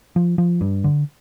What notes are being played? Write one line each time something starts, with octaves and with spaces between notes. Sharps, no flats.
F3
F3
G2
D3